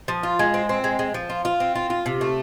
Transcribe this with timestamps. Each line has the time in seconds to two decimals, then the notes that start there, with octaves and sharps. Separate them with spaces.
0.08 F3
0.23 F4
0.39 G#3
0.54 C4
0.69 C4
0.84 G#3
0.99 G#3
1.14 F3
1.30 F4
1.45 F4
1.60 C4
1.75 F4
1.90 F4
2.06 C3
2.21 A3